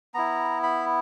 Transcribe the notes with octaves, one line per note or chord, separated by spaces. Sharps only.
B3 E4 A#5
B5